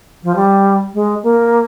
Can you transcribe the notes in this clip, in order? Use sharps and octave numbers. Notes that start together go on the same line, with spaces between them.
F3
G3
G#3
A#3